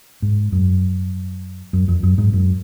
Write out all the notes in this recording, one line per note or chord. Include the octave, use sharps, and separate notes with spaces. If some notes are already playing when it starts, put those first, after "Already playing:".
G#2
F#2
F#2
F2
F#2
G#2
F#2